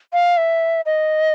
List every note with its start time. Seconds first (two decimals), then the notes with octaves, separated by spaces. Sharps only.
0.13 F5
0.37 E5
0.86 D#5